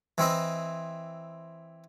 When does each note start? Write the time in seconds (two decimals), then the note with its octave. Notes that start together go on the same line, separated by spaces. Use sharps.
0.18 E3 C4 E4 D#5